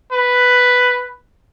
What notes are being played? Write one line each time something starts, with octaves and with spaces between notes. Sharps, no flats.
B4